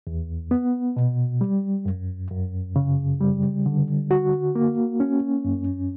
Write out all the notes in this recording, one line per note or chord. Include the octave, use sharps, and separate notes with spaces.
E2
B3
B2
G3
F#2
F#2
C#3
G3
D3
F#4
A#3
C#4
F#2